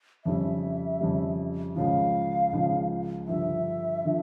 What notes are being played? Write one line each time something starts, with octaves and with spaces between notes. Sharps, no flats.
F2 C#3 G3 E5
F2 C#3 G3
C#2 C#3 F3 F5
C#2 C#3 F3
G2 D3 F3 E5
D3 F3